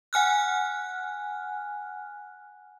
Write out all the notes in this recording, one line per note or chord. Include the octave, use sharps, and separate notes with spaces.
F#5 G#5 F6 F#6